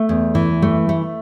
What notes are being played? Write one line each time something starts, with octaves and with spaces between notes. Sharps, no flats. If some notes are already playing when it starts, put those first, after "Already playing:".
Already playing: A3
E2
E3
A3
A3